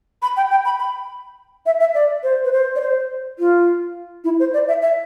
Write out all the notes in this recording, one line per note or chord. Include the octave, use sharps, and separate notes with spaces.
B5
G5
G5
B5
B5
E5
E5
D5
C5
B4
C5
D5
C5
F4
E4
C5
D5
E5
E5